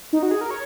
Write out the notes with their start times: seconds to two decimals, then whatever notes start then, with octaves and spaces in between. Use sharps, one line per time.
0.13 D#4
0.23 F#4
0.31 G#4
0.41 A#4
0.51 C#5